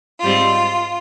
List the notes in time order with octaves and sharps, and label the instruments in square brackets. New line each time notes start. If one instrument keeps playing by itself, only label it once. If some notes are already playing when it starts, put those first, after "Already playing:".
[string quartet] G#2 G3 C4 F4